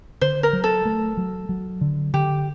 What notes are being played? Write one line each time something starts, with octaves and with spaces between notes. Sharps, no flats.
D3 C5
A#4
F#3
A4
A3
F#3
F#3
D3
D3 G4